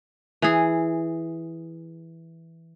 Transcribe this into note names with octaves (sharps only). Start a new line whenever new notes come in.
E3 G#4